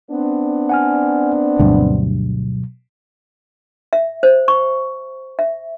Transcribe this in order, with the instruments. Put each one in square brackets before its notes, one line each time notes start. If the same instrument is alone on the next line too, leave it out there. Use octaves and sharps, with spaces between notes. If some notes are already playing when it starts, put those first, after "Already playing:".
[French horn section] B3 C4 D4
[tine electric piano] F#5 G#5 F6
[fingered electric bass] D2 G2 [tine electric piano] B2 F#3
[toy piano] E5
C5
C#6
E5